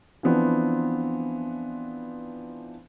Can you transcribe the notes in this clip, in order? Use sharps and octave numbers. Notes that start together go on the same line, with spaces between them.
E3 F3 B3 C4 D4